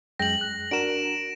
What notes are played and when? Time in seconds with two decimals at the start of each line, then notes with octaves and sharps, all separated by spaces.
0.19 F#2 G#3 G5 A#6 F#7
0.41 F#6
0.71 D4 F#4 A#4 D7 E7